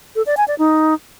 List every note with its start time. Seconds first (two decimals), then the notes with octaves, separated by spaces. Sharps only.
0.16 A4
0.26 D5
0.37 G#5
0.48 D5
0.59 D#4